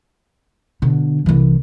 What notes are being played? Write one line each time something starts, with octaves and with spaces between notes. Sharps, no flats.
B2 D3
C2 E3